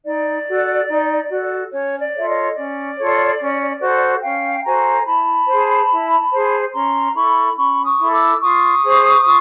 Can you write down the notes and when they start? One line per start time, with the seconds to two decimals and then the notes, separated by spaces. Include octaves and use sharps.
0.05 D#4 D5
0.47 F#4 A4
0.88 D#4
1.30 F#4 A4
1.72 C#4 C#5
1.99 D5
2.14 F4 A4 C#5 E5
2.27 C#5 D#5
2.55 C#4 D5
2.98 F4 A4 C#5
3.39 C#4
3.81 F#4 A4 C5
4.22 C#4 F5 G5
4.64 F#4 A4 C5 G#5 A#5
5.06 E4 A5 B5
5.48 G#4 C5
5.90 E4
6.32 G#4 C5
6.73 C#4 A#5 C6
7.15 E4 A4 B5 C#6
7.56 C#4 B5 C#6
7.85 C#6 D#6
7.98 E4 A4
8.12 D6 E6
8.40 F4 C#6 D#6
8.82 G#4 C5
9.24 F4